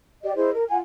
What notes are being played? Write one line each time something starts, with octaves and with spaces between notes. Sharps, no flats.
G4 D5 D#5
E4 G#4 C5 D#5
A#4
F4 F#5 G#5